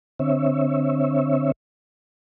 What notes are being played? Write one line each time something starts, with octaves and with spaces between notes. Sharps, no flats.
D3 C4 C#5 E5